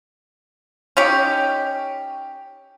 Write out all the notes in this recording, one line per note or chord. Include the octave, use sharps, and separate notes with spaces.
C#4 D#4 G4